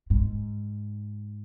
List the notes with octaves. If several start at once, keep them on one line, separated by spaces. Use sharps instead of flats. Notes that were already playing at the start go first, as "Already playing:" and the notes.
G#2